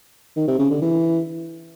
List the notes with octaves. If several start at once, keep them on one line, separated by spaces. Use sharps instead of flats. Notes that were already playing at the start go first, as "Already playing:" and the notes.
D#3
C3
C#3
D3
E3